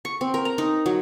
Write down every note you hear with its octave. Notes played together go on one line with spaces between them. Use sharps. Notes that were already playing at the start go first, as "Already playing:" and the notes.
C#6
C4
A#4
A#5
D#4
F#3